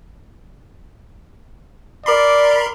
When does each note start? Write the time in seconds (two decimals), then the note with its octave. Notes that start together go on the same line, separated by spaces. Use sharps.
2.06 A#4 D5 B5 C6